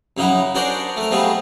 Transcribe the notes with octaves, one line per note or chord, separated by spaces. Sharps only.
F#2 C#3 D#4 E4 F#5
D4 F#4 G#4 A#4 C5 D5
A3 A#4
F3 G3 A3 B3 G#4